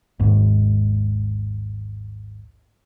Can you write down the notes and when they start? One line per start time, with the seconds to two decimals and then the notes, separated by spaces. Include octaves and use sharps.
0.19 G#1 D#2 G#2